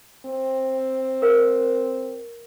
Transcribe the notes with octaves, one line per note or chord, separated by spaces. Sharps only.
C4
A#4 F5